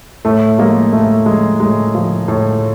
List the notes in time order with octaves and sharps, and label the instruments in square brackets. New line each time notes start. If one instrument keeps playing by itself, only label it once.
[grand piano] A2 A3
F3 G#3 A#3
A2 A3
F3 G#3
A2 G#3
F3
A2